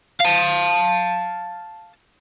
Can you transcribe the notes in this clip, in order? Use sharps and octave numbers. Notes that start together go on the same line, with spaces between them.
F5 A5